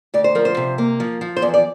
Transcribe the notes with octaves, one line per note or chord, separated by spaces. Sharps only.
D2 D5
C5
F3 A#4
C5
C3
A#3
F3
F3
C5
E2 D5
D5